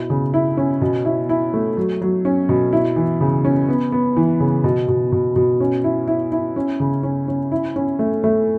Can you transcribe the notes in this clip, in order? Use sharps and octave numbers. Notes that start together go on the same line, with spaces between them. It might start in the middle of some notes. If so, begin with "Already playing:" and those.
Already playing: B2 E4
C#3
E4
C#4
B2
E4
E4
A3
F#3
F#3
C#4
B2
E4
E3
C#3
C#4
B3
B3
E3
C#3
B2
B2
B2
B2
C#4
E4
E4
E4
C#4
C#3
C#4
C#4
E4
C#4
A3
A3